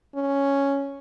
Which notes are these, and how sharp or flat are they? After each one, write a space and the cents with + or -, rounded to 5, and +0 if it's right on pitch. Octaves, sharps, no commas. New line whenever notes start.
C#4 +0